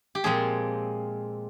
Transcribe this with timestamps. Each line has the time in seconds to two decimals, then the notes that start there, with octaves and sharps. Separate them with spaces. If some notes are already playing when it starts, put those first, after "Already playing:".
0.15 G4
0.24 A#2 F3 G#3 C4 G#4